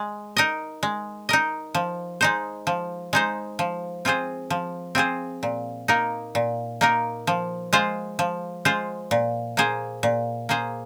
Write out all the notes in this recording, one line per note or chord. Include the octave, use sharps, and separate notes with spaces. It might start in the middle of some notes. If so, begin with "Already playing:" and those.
Already playing: G#3
D#4 A#4 D#5
G#3
D#4 A#4 D#5
F3
G#3 D#4 C5
F3
G#3 D#4 C5
F3
C4 F4 G#4 C5
F3
C4 F4 G#4 C5
A#2
A#3 D#4 A#4
A#2
A#3 D#4 A#4
F3
G#3 F4 C5
F3
G#3 F4 C5
A#2
A#3 G#4 C5
A#2
A#3 G#4 C5